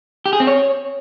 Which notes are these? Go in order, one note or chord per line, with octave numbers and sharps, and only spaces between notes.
G4
G#4
C4
C#5